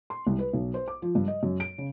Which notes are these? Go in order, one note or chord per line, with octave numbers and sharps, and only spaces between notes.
C6
C2
B4
B1
C5
D6
F3
G2
D#5
F#2
D7
C#3